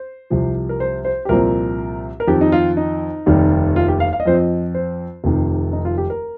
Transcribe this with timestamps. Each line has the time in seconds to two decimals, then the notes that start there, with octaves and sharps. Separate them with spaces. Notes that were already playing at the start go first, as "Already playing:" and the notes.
Already playing: C5
0.30 C2 C3 F3
0.69 A#4
0.80 C5
1.05 C5
1.25 G4
1.29 C2 A#2 F3 C4 A#4
2.20 A#4
2.27 F2 D#3 C4 G4
2.41 D#4
2.52 F4
2.77 D#4
3.26 F1 D#2 D#3 G3
3.76 F4
3.88 G4
4.00 F5
4.13 F5
4.20 D#5
4.26 F2 F3 C4 C5
4.34 D#5
4.74 C5
5.24 F1 F2 C3 D#3
5.73 D#4
5.85 F4
5.98 G4
6.10 A#4